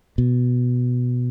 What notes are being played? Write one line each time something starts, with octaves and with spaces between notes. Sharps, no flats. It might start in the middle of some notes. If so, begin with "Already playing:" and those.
B2